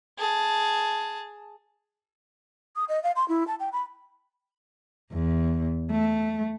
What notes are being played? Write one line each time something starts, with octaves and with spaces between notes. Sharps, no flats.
G#4 A5
D#6
D#5
F5
C6
E4
A5
G5
B5
E2
A3